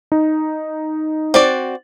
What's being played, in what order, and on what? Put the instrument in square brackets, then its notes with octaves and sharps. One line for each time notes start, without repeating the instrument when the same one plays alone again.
[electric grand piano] D#4
[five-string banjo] C4 F#4 D5